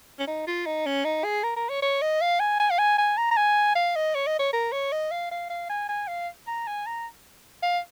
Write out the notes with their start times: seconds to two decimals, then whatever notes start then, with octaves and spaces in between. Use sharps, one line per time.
0.19 C#4
0.27 D#4
0.47 F4
0.66 D#4
0.86 C#4
1.05 D#4
1.24 G#4
1.44 A#4
1.56 A#4
1.69 C#5
1.82 C#5
2.02 D#5
2.21 F5
2.40 G#5
2.60 G#5
2.71 F5
2.79 G#5
2.98 G#5
3.17 A#5
3.31 A#5
3.37 G#5
3.76 F5
3.96 D#5
4.15 C#5
4.27 D#5
4.39 C#5
4.53 A#4
4.72 C#5
4.93 D#5
5.12 F5
5.31 F5
5.50 F5
5.70 G#5
5.89 G#5
6.08 F5
6.47 A#5
6.67 G#5
6.86 A#5
7.63 F5